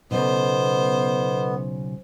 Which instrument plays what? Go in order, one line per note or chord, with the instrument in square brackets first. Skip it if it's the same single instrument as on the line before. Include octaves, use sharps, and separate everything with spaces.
[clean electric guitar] B1 C#3 [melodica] B3 [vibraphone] A4 D#5 [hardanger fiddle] C5